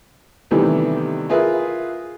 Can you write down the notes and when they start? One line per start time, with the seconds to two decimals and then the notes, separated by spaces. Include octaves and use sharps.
0.51 C3 D#3 E3 G3 A3 B3
1.30 F4 G#4 A#4 B4 E5